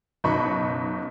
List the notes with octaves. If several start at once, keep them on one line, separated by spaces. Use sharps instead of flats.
F#1 B1 D#4 B5 C#6